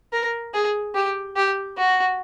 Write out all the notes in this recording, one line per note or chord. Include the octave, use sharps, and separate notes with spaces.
A#4
G#4
G4
G4
F#4